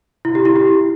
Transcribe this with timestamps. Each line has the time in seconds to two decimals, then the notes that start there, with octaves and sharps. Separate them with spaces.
0.25 E4
0.35 G4
0.45 E4
0.56 G4